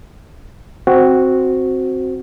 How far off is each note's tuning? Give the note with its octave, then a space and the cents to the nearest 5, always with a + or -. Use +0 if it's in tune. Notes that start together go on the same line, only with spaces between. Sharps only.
C4 +0 F#4 +0 C5 +0